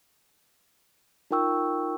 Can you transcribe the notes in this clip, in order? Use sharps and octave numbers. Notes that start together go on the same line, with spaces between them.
D#4 F4 A#4 G5 C#6 E6